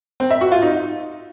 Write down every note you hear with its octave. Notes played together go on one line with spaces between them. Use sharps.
C4
E5
F#4
F4
D#4